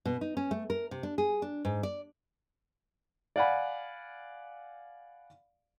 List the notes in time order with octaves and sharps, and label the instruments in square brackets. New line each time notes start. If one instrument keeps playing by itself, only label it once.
[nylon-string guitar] B2
D#4
C#4
A3
A#4
C3
D4
G#4
D4
G#2
D5
[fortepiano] D5 F5 F#5 G#5 B5